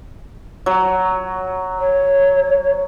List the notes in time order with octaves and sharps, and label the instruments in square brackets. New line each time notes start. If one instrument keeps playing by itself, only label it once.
[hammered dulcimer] F#3
[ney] C#5